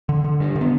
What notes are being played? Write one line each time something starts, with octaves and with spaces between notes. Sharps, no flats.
D3
D3
G2
D3
B3